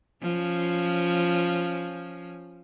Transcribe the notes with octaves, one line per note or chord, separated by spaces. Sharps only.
F3 C#4